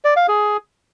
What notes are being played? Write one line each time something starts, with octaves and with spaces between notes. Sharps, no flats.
D5
F5
G#4